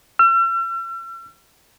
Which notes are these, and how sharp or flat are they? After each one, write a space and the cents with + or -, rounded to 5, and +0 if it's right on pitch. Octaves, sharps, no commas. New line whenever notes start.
E6 +45